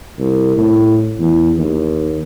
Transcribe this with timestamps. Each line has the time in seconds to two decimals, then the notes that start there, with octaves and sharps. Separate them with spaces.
0.19 C2
0.57 A2
1.19 E2
1.58 D#2